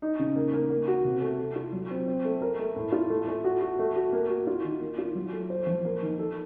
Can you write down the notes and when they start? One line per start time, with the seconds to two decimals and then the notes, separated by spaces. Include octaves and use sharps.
0.02 D#4
0.19 C#3
0.36 A#3
0.53 A#3
0.70 A#3
0.88 F#4
1.05 C3
1.22 A3
1.39 A4
1.56 F4
1.73 F#3
1.91 C4
2.08 C4
2.25 A3
2.41 A#4
2.59 A3
2.76 A2
2.92 F4
3.10 A3
3.28 A3
3.44 F#4
3.62 F#4
3.79 A3
3.96 F#4
4.13 A#3
4.30 F#4
4.47 F4
4.64 D#3
4.81 A#3
4.98 F4
5.15 F#3
5.33 A3
5.50 C5
5.67 F3
5.85 A#3
6.02 D#3
6.19 A4